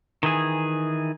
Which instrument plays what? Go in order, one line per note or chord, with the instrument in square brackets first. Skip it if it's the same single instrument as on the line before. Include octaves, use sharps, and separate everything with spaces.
[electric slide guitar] D#3 E3 G#4